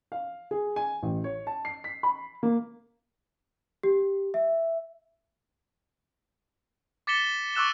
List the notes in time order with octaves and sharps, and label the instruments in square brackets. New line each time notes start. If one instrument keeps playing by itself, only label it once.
[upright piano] F5
G#4
G#5
A1
C#5
A5
C7
B6
B5
A#3
[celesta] G4
E5
[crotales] D6 A6 B6 C#7 E7 G7
C#6 D6 E6 F#6 E7